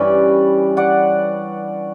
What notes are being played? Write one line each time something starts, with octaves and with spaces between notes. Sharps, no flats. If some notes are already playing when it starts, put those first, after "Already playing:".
Already playing: G2 E3 G3 C#4 B4 D5
D5 F#5